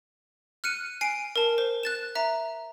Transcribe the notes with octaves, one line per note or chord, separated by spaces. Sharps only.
F6 F#6 C#7 D#7
G#5 C7 D7
A#4 A5
C5
F#6 A6 E7
E5 A#5